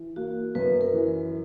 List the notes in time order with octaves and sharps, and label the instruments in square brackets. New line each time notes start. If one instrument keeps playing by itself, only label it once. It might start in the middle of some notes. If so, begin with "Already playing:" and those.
Already playing: [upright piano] E3
[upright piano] A#3 [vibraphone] F#4
[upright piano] F#2 [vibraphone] B4
[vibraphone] A#4
[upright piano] E3